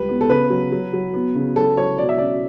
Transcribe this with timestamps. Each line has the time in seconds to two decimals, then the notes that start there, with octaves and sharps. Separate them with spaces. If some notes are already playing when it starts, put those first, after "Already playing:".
Already playing: C#2 G3 B4
0.09 B3
0.21 A4
0.29 C#3 B4
0.50 F#3
0.72 F#3
0.93 F#3
1.14 B3
1.35 C#3
1.56 F#3 A4
1.77 F#3 C#5
1.98 B2 D5
2.09 E5
2.18 C#4 D5